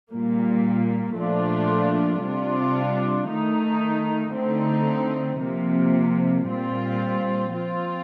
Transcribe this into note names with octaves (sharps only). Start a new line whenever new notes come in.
A#2 G3 A#3
A#2 F3 A3 D4 F4
C3 G3 D4 F4
D#3 A3 D#4
D3 A3 C4 D#4
C3 F3 A#3
A#2 G3 C4 F4
F3 C4 F4